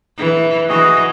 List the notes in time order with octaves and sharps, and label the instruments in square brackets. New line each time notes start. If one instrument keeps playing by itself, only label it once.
[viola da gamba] E3
[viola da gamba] E3 [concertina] F#4 G#4 D#5